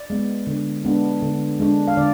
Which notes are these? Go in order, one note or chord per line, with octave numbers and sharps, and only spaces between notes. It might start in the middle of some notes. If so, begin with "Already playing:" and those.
Already playing: D5
G#3 B3
D3
G#3 B3 D4
D3
G#3 D4
F5
D3 D5